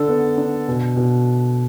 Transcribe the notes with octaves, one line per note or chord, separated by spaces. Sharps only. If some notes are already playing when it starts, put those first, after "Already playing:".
Already playing: D3 D4 A4
B3
D4
B2
B2